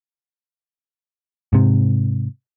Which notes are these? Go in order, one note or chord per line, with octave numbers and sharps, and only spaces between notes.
G#2 C3